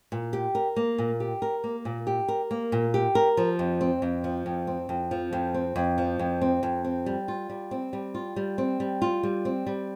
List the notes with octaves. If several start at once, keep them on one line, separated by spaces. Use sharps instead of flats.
A#2
G4
A#4
A#3
A#2
G4
A#4
A#3
A#2
G4
A#4
A#3
A#2
G4
A#4
F3
F2
C4
F2
F3
F2
C4
F2
F3
F2
C4
F2
F3
F2
C4
F2
C4
G3
F4
G3
C4
G3
F4
G3
C4
G3
F4
G3
C4
G3